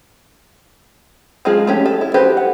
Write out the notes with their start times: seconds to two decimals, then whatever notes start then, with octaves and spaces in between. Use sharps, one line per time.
1.45 F3 G#3 D#4 F4 G#4
1.67 A3 C#4 G4
1.86 A4
2.01 E4
2.14 F#4 G4 A4 B4 C5
2.37 F#5